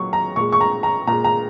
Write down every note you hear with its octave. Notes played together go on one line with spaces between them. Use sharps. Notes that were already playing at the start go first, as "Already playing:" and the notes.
Already playing: A#2 F#3 C#6
A#5
A#2 G#3 C#6
C#6
A#5
A#5
A#2 G#3 A#5
A#5